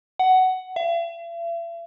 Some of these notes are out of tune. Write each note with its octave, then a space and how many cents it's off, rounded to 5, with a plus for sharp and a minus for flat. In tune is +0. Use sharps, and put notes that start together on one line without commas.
F#5 +10
E5 +45